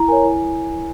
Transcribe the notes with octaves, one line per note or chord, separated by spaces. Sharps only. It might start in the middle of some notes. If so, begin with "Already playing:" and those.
Already playing: E4 A#5
A#4 C#5 G#5
E4